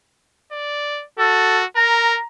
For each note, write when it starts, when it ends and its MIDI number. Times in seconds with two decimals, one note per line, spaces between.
0.52 1.04 74
1.19 1.65 66
1.19 1.58 69
1.76 2.18 70
1.76 2.26 82